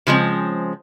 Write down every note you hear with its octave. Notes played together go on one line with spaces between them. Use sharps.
C#3 F3 G#3 C4